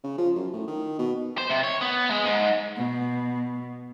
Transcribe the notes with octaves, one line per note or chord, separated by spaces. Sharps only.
C#3
F3
F#2
A2
D#3
B2
C5
C3
C#5
B3
G#3
G#2
B2